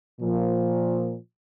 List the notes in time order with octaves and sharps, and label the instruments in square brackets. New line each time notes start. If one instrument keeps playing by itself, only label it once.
[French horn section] A#2 F3